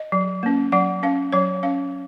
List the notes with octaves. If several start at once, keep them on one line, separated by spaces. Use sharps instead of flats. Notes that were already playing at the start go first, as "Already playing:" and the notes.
Already playing: D#5
F#3
A#3 C#4
F#3 F#5
C#4 F5
F#3 C#5
C#4 F5